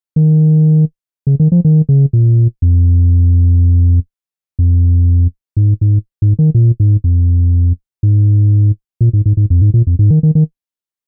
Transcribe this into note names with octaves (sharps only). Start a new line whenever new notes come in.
D#3
C#3
D#3
F3
D#3
C#3
A#2
F2
F2
G#2
G#2
G#2
D#3
A#2
G#2
F2
G#2
A#2
G#2
G#2
G#2
F2
G#2
A#2
F2
G#2
D#3
D#3
D#3